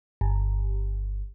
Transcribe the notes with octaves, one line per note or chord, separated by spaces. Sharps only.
G1